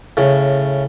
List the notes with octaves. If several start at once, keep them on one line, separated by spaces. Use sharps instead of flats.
A2 C#3